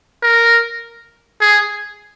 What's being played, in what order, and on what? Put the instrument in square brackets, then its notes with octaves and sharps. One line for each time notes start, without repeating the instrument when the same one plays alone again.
[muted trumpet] A#4
G#4